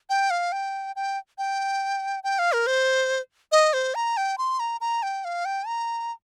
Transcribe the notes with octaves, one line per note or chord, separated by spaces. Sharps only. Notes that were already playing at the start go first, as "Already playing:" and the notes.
G5
F5
G5
G5
G5
G5
F5
A#4
C5
D#5
C5
A#5
G5
C6
A#5
A#5
G5
F5
G5
A#5